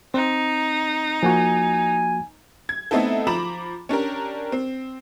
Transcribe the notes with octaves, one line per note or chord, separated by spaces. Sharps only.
C4 D#4
F3 A#3 F#4 G#5
G#6
A3 B3 C4 D#4 E4 A4
F3 A#5 B5 D6 E7
C#4 D4 G4 A#4
C4